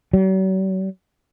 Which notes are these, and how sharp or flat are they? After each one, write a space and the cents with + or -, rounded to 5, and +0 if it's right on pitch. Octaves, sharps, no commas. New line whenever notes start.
F#3 +45